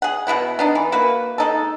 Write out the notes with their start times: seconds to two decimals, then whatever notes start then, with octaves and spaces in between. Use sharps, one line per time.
0.02 G#4 F#5
0.27 B2 C#4 E4 F#5
0.59 B3 D4 D#4
0.75 E3
0.92 A#3 F#4 B4
1.38 G#3 D#4 A4